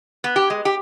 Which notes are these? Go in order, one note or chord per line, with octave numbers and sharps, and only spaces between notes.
B3
G4
G#3
G4